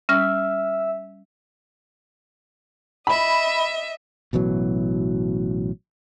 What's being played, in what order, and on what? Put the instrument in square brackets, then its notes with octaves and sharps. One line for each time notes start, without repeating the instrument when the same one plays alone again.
[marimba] G3 C#4 [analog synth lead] E5 [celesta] F6
[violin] D#5 E5 [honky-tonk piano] B5
[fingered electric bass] A1 B2 E3 F#3